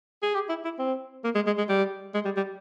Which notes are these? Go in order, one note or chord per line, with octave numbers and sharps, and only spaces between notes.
G#4
G4
E4
E4
C4
A#3
G#3
G#3
G#3
G3
G#3
G3
G3